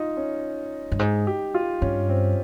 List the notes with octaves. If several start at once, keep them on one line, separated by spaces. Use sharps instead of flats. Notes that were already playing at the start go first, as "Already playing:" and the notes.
Already playing: D#4 F4
C#4
G2
G#2 D#4
G4
F4
G2 C#4
C4